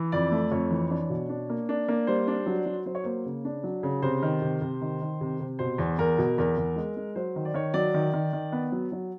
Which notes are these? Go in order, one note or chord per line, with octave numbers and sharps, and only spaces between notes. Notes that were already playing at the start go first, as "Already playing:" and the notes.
Already playing: E3
F2 D5
A3
F2 C#5
E3
D4 C#5
B2
D4
A#3
D4
A#3
G3 C5
D4
F#3
F#3
F#3 C5
C#5
A#3 C5
C#3
D4
F#3
C#3
C3 C5
D#3
C3
C3
D#3
D#3
C3
C3
B2 C5
E2
E2 A#4
B2
E2 A#4
E2
G#3
G#3
F#3 C5
D#3
D5
D#3 C#5
F#3 D5
D#3
D#3
D#3
B3
F#3
F#3